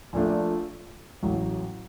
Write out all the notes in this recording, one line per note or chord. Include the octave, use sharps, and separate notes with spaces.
A#1 A#2 A3 D4
A1 A2 F#3